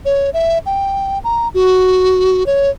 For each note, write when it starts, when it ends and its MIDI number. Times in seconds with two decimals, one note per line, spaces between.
0.05 0.30 73
0.34 0.58 76
0.66 1.19 79
1.24 1.48 82
1.54 2.46 66
2.46 2.70 73